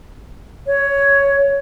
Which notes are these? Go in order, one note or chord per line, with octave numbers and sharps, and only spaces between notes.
C#5